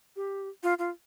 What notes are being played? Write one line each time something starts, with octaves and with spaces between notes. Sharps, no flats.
G4
F4
F4